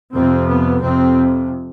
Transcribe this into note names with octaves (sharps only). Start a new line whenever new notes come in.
F2 C3 C4
B3
F2 C3 C4